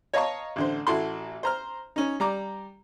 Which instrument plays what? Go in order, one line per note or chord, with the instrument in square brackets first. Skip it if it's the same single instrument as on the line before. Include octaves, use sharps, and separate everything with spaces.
[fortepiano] C#5 D#5 F5 A5 A#5 C#6
A1 D3 C5
A1 E4 F#4 A4 C6
C5 A#5 F6
C#4 D#4
G3 A#5 D6